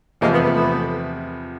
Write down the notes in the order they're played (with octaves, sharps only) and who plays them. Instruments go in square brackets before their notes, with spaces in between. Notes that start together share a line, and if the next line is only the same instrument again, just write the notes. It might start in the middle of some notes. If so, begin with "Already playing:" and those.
[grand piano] E2 C3 F3 [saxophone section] G#3 A#3
[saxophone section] A3 B3
A3 B3
A3 B3